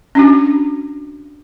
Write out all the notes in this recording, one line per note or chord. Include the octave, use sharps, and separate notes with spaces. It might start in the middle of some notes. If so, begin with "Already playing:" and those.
C#4 D4 F#4